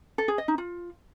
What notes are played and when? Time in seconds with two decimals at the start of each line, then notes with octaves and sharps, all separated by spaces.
0.18 A4
0.28 G#4
0.38 D#5
0.48 D#4
0.58 F4